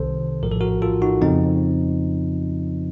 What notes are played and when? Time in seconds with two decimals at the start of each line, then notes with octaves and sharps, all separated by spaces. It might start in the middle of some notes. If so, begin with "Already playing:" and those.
Already playing: C2 C3 D#3 A4 C5
0.43 A#1 A2 F3 A#4
0.51 A4
0.61 F#4 A#4
0.82 F4 A4
1.02 D#4 F#4
1.22 F2 C#3 F3 C4 D#4